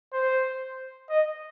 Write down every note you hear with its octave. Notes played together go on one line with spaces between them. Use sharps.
C5
D#5